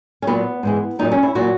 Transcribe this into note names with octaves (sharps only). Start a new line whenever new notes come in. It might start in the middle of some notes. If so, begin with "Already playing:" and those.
C#4
A#2 F#3 B3
G#2 E3 G#3
A#2 F#3 D#4
C#4
E4
A#2 F#3 F#4